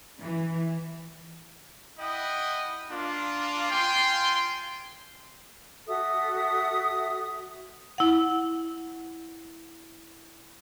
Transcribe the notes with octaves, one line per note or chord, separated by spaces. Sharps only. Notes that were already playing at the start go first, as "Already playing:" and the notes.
E3
E4 D#5 F#5 G5 D#6
A#3 D4 F4
F4 G5 G#5 C6
F#4 A4 E5 D#6
E4 F#5